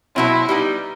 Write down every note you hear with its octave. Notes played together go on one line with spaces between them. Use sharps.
B2 F#3 A3 C4 E4
G3 B3 D#4